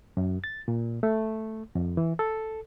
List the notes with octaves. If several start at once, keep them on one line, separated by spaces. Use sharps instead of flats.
F#2
A6
A#2
A3
F2
E3
A4